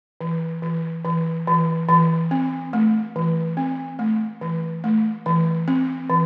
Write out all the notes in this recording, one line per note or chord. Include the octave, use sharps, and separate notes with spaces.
E3
E3
E3
E3
E3
C4
A3
E3
C4
A3
E3
A3
E3
C4
E3